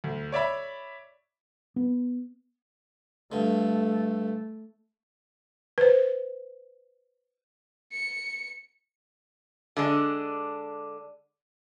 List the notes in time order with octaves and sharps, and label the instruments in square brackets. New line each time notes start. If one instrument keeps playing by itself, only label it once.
[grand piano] D2
C#5 D5 E5 B5
[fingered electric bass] B3
[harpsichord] G2 D3 [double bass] A3
[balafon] B4 C5
[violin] C#7
[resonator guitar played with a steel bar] D3 G#3 D4